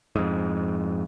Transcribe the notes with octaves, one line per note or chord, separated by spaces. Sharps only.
F2 G#2